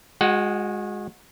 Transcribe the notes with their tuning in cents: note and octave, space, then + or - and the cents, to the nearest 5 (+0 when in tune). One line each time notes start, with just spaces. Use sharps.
G#3 -10 F#4 -30 F#5 +20